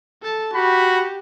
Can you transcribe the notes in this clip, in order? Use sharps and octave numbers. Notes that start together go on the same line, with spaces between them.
A4 A5
F#4 G4 B5